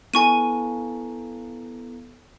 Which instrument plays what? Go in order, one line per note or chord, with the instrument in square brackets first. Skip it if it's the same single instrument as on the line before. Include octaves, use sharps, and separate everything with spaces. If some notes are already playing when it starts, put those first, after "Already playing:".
[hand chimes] B3 E4 A4 [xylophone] G#5 C#6 D#7